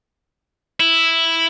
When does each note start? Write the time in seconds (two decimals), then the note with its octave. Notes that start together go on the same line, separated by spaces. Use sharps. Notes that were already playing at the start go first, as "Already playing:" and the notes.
0.80 E4